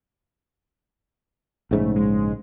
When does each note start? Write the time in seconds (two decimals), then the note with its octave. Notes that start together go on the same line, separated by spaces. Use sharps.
1.71 A#1 G#2 C#3 A3
1.96 G#3